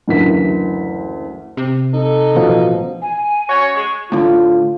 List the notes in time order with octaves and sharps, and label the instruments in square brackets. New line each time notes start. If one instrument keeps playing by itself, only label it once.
[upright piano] F#1 D2 E3 A#4 B6
[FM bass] C3
[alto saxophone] D#4 [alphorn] A4
[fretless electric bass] A1 B2 F3
[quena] G#5
[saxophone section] C#4 F#4 C#5
[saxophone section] G#3 [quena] C#6
[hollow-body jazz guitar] A2 D3 [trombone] F4